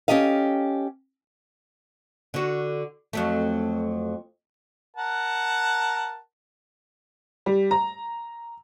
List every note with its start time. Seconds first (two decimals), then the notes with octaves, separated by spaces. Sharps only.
0.08 C#4 D4 G4 A4 D#5 F5
2.34 D3 F#4
3.13 F2 F#3 A3
4.97 A#4 F#5 A5
7.46 G3
7.71 A#5